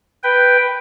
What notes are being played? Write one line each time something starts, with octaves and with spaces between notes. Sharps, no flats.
B4 G5